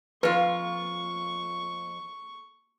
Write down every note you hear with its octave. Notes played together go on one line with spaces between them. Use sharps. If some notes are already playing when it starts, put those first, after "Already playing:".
F2 F4 B4 C#6